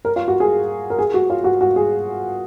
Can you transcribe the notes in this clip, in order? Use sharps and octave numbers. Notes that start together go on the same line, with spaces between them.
A#4
F4
F#4
G#4
A#4
G#4
F#4
F4
F#4
F#4
G#4